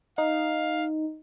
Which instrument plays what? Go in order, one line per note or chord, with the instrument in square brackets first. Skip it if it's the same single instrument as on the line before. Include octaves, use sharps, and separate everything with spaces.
[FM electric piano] D#4 [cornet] F5